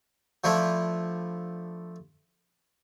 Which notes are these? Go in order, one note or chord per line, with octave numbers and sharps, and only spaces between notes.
F3 A3 D4 E4